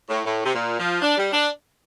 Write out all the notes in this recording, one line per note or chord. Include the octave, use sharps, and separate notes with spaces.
A2
A2
C3
A#2
F3
D4
G3
D4